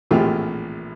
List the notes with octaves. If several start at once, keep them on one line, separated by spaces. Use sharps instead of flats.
A#1 A2 E3 G#3 C4 F4 G4